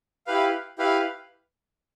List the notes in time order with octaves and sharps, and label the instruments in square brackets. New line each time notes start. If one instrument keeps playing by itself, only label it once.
[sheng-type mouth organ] E4 G4 B4 F5
E4 G4 B4 F5